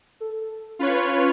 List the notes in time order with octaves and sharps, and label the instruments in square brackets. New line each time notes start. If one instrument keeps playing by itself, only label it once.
[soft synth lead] A4
[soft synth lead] C#4 [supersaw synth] F4 B4 C#5